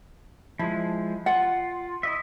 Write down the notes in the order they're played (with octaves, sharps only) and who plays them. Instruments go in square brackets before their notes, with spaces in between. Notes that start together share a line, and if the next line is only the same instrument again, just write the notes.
[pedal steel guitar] F3 G#3 [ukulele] E4
[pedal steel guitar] F4 [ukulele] F#5
[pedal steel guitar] E4 D#5 E5